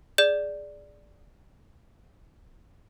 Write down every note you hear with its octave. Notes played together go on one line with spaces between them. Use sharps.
G#4 D5 G6